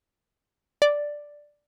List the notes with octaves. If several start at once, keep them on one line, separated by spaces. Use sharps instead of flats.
D5